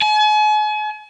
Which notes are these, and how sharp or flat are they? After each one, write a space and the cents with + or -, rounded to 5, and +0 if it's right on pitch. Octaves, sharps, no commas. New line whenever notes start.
G#5 +40